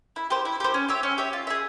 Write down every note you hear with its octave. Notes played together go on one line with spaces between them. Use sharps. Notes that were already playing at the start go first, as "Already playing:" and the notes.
E4
G4 C5
E4
G4 C5
C#4
G4 C#5 E5
C#4
G4 C#5 E5
F4
G#4 E5